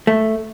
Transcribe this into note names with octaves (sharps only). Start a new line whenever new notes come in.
A3